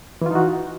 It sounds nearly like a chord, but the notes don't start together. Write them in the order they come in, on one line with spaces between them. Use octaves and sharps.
E3 F4 D#4 F#4